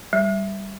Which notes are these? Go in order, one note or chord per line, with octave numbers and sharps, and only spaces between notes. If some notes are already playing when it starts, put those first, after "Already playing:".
G3